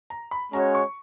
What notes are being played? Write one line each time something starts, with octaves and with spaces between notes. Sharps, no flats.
A#5
B5
G#3 C#4 F#4 C#5 A#5
C#6